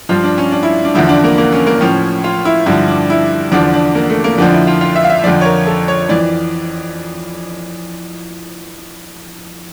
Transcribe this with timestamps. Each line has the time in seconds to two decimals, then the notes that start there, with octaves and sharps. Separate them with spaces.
0.09 G2 F3 F4
0.24 D4
0.38 C#4
0.52 D4
0.63 E4
0.85 D4
0.95 E2 D3 F3 E4
1.09 D4
1.24 A#3
1.38 A#3
1.52 C#4
1.67 A#3
1.81 A2 F3 C#4
2.24 F4
2.45 E4
2.66 G2 D3 F3 E4
2.88 D4
3.10 E4
3.52 E2 D3 F3 D4
3.74 D4
3.95 A#3
4.10 A3
4.24 A#3
4.38 F2 D3 F3 D4
4.52 E4
4.67 F4
4.81 F4
4.96 E5
5.04 F5
5.10 E5
5.24 F2 D3 F3 D5
5.41 C#5
5.45 A#4
5.67 A4
5.88 C#5
6.09 F2 E3 D5